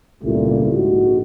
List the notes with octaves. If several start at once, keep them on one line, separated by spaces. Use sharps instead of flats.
G#1 C#2 A#2 G3 A3 E4
A#1 G#2 G#3 F#4